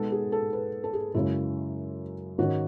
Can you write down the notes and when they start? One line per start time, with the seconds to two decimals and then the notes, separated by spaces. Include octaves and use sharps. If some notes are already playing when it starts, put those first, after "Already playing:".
Already playing: B2 G#3 B3 D#4 A4
0.12 G#4
0.32 A4
0.53 B4
0.84 A4
0.93 G#4
1.14 F#2 C#3 G#3 C#4 E4
2.38 G#2 D#3 G#3 C#4 F#4